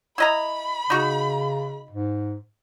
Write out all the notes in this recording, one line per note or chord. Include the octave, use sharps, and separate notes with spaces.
E4 D#5 A#5 B5
C#3 D#4 F#4
G#2